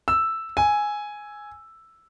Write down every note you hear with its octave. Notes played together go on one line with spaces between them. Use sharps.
E6
G#5